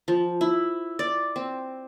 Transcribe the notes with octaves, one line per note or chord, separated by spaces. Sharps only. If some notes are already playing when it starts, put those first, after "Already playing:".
F3
E4
D5
C4